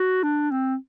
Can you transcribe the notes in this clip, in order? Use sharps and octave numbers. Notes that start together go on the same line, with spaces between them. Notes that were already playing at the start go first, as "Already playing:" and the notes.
Already playing: F#4
D4
C4